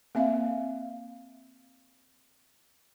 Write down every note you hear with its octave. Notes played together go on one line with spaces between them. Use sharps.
A#3 C4 E5 F5